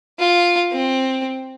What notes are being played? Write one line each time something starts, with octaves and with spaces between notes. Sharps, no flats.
F4
C4